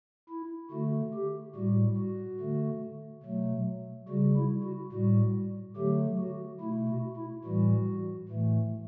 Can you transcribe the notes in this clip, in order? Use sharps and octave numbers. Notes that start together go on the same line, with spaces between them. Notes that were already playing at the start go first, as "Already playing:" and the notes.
E4
D3 A3 F#4
G4
A2 G3 F#4
F#4
D3 A3
B2 F#3 A3
C#3 G3 F#4
E4
F#4
A2 G3 F#4
D3 F#3 A3 G4
F#4
B2 A3 E4
F#4
E4
A2 E3 G3 F#4
A2 E3 A3